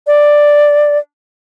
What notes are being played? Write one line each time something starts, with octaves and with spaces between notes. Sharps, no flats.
D5